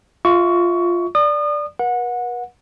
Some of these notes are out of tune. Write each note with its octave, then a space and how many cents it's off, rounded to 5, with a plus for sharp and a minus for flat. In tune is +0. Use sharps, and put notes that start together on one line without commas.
F4 +0 E5 -25 C#6 +20
D5 +0 D#6 -35
B4 -45 F#5 -25